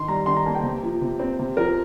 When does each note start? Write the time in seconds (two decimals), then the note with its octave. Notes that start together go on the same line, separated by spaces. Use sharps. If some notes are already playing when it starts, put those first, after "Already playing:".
Already playing: D#3 C6
0.08 G3 A#5
0.26 D#3 C6
0.37 A#5
0.46 A#3 A5
0.55 G5
0.63 C3
0.83 F3
1.02 C3
1.19 C4
1.39 C3
1.57 F3 A#4